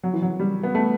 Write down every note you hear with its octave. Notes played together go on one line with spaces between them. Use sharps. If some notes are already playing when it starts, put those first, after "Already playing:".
F#3
E3
F#3
G3
B3
A3